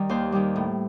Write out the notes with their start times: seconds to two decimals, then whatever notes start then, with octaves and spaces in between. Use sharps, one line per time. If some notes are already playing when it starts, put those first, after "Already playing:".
Already playing: D#3 G3 A#4
0.09 D#2 C5
0.32 D#3 G3
0.56 A2